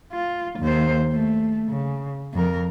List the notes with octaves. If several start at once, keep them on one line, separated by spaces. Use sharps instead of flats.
F4
D#2 C5
A3
C#3
F2 A#4